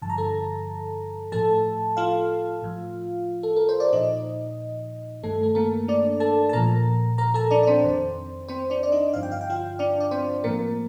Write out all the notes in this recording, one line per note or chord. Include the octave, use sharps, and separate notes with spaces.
G2 D3 F3 A5
A#5
A4 A5
A2 F3 A4 A5
F4 F5
A2 F3
A4
A#4
C5
D5
A#2 F3 D#4 D#5
G2 D#3 A3 A4
A4
A#3 A#4
D4 D5
A4 A5
A5
A#2 F3 A#4 A#5
A#4 A#5
A4 A5
D4 D5
D5
C4 C5
F2 D#3
C4 C5
D4 D5
D5
D#4 D#5
G2 D3 F3 F5
G5
F5
G5
F4 F5
D4 D5
D5
C4 C5
A2 F3 A#3 A#4